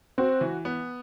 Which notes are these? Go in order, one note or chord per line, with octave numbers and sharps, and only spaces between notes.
C4 F#4
E3
B3